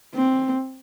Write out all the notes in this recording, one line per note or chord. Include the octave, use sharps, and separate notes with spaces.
C4